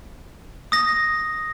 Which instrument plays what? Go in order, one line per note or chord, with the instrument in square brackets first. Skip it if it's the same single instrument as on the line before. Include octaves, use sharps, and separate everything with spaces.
[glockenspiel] D#6 A#6